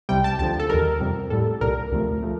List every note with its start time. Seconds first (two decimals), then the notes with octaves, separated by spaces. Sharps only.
0.09 C2 C3 G3 G5
0.24 A5
0.39 D2 D3 F3 A5
0.60 A4
0.69 D#2 D#3 G3 A#4
1.00 F2 C3 G3
1.30 A2 G3 A4
1.61 C2 A#2 G3 A#4
1.92 D2 C3 F3 A3
2.22 F3 A3